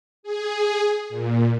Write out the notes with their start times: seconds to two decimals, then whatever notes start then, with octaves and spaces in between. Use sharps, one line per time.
0.23 G#4
1.09 A#2